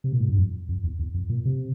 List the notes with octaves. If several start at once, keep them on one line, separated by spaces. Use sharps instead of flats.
C3
A#2
G#2
G2
F2
F2
E2
E2
F2
A#2
C3